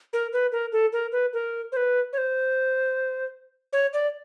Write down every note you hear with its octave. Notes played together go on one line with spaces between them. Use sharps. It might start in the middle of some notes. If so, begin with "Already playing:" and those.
A#4
B4
A#4
A4
A#4
B4
A#4
C5
B4
C#5
C5
C#5
D5